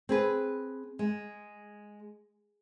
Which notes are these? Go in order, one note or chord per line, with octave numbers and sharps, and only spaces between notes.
C4 G#4 B4
G#3